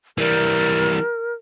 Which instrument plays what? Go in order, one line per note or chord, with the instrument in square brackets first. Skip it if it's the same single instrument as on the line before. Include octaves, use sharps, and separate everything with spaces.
[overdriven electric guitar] E3 G3 [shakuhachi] A#4